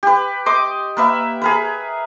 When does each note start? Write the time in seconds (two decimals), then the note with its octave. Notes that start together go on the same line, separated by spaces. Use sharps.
0.03 G4 B4
0.46 D#5 C6 D6
0.97 A#3 B4 E5
1.42 G#4 A#4 B4